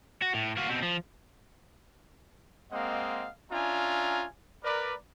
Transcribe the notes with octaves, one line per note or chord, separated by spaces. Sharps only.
F#4
A2
A#3 F#4
B2 C4
F3
G#3 A#3 C4 D#5 F5 F#5
C#4 D4 F4 E5 G#5 A#5
A#4 B4 D5